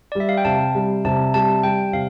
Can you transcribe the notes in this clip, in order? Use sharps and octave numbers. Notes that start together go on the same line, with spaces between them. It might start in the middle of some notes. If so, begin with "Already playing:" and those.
D5
G3 E5
F5
G5
C3 A5
G3
C3 A5
G3 A5
G3 G5
C3 F5